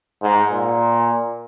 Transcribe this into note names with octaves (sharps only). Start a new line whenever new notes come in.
G#2
A#2